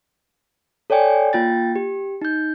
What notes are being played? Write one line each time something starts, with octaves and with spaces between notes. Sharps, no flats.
A4 C#5 D5 G5 G#5
A#3 F4 G5 A6
G4
D#4 G6